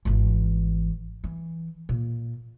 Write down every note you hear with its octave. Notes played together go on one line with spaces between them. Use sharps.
G#1 E3
E3
A#2